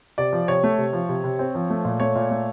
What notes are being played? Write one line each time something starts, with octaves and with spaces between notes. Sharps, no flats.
C3 D5
F3
C3 C#5
A3
C3
F3
C3
C3
C4
F3
A3
A#2
A3 C#5
A#2
A3